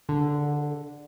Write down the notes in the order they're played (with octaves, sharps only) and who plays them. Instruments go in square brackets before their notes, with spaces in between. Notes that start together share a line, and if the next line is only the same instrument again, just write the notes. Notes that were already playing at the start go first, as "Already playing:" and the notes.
[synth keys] D3